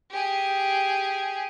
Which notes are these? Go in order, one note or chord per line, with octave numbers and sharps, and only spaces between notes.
G4 G#4